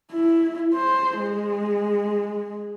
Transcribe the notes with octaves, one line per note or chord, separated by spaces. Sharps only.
E4
C5
G#3